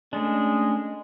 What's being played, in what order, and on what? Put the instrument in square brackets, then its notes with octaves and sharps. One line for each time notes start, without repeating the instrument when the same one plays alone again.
[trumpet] G#3 [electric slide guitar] A3 C#4 D4